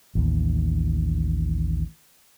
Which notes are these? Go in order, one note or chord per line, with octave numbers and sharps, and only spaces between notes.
A1 D#2